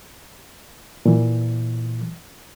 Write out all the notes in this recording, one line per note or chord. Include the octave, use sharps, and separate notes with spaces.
A#2 E3